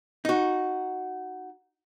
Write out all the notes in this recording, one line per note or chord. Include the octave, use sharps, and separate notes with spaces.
D#4 F#4